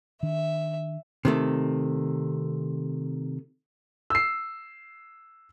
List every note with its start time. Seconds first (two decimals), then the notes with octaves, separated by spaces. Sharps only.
0.23 D#3 D4 E5
1.25 C3 D#3 A3
4.10 E6 C7